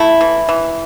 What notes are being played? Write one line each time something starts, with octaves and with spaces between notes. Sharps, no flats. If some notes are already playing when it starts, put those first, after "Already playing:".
Already playing: A3 E4
E3
E3